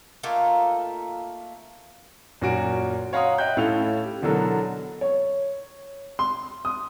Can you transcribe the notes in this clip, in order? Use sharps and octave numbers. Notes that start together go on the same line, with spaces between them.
A3 A#3 D#4 F4
F#2 A#2 F#4 D7
C#5 F5 F#5 A#5 C6 D#6
D#5 E5 G5 F#6 G6
A2 C#4 E4 A4 F5 F7
G4
B2 D3 E3 F#3 A4 A#4
C#5
C6
D#6